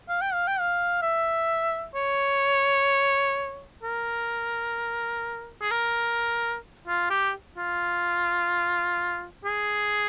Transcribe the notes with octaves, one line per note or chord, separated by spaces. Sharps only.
F5
G5
F5
G5
F5
E5
C#5
A#4
G#4
A#4
F4
G4
F4
G#4